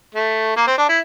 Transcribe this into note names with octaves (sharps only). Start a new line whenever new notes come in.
A3
A#3
C4
D4
E4